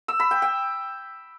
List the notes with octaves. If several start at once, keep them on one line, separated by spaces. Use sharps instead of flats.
E6
B5
G5
G5